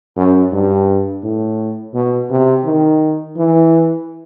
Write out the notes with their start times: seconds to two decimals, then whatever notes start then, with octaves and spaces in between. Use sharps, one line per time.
0.17 F#2
0.53 G2
1.23 A2
1.94 B2
2.30 C3
2.65 D#3
3.37 E3